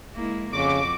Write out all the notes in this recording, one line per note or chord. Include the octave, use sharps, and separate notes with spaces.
G#3 A#3 E4
F2 C#3 F#4 D6